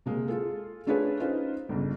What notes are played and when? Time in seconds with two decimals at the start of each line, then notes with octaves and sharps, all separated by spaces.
0.06 C3 G#3 A#3
0.28 F4 G#4 A4
0.87 A3 D4 F4 G#4 B4 C#5
1.20 C#4 D#4 F4 B4 C5
1.69 G1 C#2